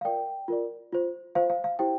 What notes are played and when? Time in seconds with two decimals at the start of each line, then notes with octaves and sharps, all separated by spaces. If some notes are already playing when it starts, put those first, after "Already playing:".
0.01 F5
0.05 F4 A#4 D5 G5
0.48 F4 A#4 D5
0.92 F4 C5
1.35 F4 C5 F5
1.50 F5
1.64 F5
1.79 E4 G4 C5 G5